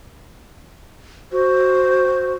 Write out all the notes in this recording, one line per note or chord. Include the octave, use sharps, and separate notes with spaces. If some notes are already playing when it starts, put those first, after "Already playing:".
F#4 C5